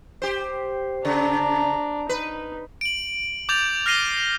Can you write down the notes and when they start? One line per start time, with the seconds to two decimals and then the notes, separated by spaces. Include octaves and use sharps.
0.22 G4 C5
1.05 C#3 D4 A#5
2.09 D#4 B4
2.81 D7 F#7
3.49 D6 G6 A6 F7
3.86 F6 A#6 C7 D#7 G7